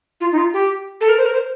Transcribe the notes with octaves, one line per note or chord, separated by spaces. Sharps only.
F4
D#4
F4
G4
A4
A#4
C5
A#4
C5